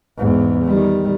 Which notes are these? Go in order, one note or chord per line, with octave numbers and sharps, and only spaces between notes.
E2 G#2
D#3 G3